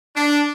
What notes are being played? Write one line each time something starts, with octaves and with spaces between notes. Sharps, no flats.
D4